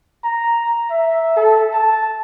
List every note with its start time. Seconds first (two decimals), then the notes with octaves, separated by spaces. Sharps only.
0.24 A#5
0.90 E5
1.36 A4
1.74 A5